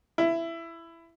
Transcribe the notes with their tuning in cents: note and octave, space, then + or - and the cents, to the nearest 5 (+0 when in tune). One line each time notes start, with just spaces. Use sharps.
E4 +15